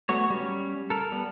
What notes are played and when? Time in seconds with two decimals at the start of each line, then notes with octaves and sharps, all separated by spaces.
0.09 F#3 A3 B3 F#4 C#5
0.30 G3 C#4
0.90 A4 A#4
1.12 G3 B3